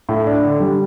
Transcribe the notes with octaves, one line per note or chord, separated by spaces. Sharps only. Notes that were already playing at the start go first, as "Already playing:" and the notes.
A2
D4
D3
G3